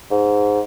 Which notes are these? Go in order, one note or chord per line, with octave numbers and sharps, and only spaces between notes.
G#2